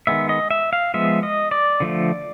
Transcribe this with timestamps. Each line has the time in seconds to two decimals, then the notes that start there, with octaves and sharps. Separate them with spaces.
0.07 D#3 G#3 B3 E5
0.29 D#5
0.51 E5
0.73 F5
0.94 F3 G#3 B3 E5
1.23 D#5
1.51 D5
1.80 D3 F3 A3